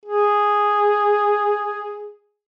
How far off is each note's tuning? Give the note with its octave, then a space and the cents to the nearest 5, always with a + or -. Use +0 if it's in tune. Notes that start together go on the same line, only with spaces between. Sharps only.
G#4 -5